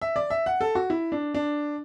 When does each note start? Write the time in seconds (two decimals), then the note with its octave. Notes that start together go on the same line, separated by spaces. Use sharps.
0.02 E5
0.16 D5
0.30 E5
0.46 F#5
0.61 A4
0.75 F#4
0.90 E4
1.12 D4
1.34 D4